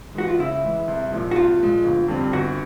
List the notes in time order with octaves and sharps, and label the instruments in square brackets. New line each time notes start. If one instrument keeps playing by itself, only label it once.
[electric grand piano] E3 G#3 [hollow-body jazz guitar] F#4
[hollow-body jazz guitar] F4
[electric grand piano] C#3 [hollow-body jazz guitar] E4
[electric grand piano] E3 G#3
C2
A#2 F3 G#3
[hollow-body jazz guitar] F#4
[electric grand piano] C2 [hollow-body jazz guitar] F4
[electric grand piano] A#2 F3 G#3
G1
F2 D3 G3 C4
[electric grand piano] G1 [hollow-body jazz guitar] F#4